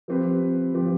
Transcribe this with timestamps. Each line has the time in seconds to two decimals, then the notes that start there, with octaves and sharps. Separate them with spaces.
0.08 F3 C4 G4 B4
0.74 F3 C4 G4 B4